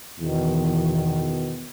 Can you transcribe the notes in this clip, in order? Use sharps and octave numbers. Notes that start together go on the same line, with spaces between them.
E2 B2 D#3